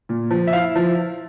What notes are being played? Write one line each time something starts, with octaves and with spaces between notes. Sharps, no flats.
A#2
F3
E5
E4 F5
F3